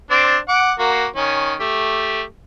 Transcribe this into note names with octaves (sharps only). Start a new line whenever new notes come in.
C4 D4 D5
F#5 D6
A#3 F#4
D#3 C#4
A3 G4